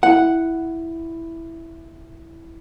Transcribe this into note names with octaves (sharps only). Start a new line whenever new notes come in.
E4 F#5